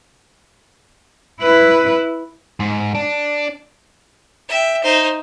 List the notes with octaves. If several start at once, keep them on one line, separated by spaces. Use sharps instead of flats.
E4 B4
G#2
D4
E5 G5
D#4 C5